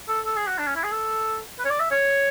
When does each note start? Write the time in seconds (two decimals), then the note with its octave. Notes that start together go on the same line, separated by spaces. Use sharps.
0.09 A4
0.26 A4
0.37 G#4
0.47 F#4
0.59 D4
0.67 C#4
0.76 E4
0.84 G#4
0.92 A4
1.59 B4
1.65 C#5
1.70 D5
1.80 E5
1.91 C#5